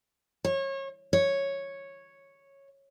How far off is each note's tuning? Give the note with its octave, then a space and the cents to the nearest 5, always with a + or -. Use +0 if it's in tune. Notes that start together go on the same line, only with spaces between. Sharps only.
C#5 -30
C#5 -5